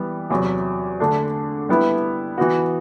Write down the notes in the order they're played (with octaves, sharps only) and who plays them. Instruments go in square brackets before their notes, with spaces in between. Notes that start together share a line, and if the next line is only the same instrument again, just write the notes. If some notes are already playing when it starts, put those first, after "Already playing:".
Already playing: [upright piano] E3 G3 B3
E2 C3 F#3
D3 A3 D4
G3 B3 E4
E3 B3 F#4